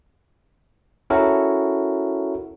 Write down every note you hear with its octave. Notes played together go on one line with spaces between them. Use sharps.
C#4 E4 F#4 A4 A#4